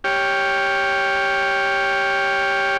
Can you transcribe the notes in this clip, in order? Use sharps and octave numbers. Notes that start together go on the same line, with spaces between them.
G4 C#5 G5 F6